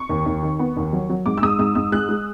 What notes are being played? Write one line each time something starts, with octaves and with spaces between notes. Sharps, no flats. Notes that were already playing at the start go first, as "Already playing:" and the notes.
Already playing: C#6
D#2
D#2
D#3
B3
D#2
F#3
F#3
G#2 D6
E6
G#2 D#6
G#2 E6
G#2 E6
G#3 F#6
G#3